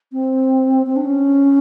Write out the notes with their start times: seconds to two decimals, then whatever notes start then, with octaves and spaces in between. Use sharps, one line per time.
0.12 C4
0.86 C4
0.96 D4
1.05 C#4